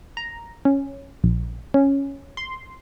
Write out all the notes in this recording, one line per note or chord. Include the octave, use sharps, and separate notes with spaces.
A#5
C#4
A#1
C#4
C6